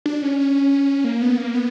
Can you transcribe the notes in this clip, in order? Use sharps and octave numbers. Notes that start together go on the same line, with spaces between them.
D4
C#4
A#3
B3
A#3
B3